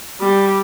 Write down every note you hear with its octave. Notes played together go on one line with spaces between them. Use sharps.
G3